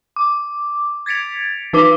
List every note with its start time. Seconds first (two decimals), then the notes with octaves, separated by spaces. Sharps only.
0.16 D6
1.06 G#6 A6 B6 C#7 D7 F7
1.73 E3 D#4 B4 D6 B6 G7